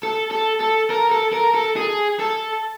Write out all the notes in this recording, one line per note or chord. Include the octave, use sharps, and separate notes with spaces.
A4
A4
A4
A#4
A4
A#4
A4
G#4
A4